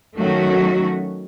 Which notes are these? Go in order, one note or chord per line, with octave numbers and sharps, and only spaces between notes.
D#3 F#3 A3 C#4 F#4